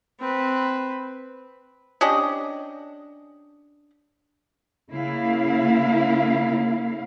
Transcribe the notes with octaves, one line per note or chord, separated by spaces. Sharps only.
C4 B4
C#4 D4 G4 D#5
C#3 A#3 E4 F5